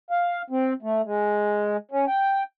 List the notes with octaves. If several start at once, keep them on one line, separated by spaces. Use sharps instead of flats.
F5
C4
A3
G#3
C#4
G5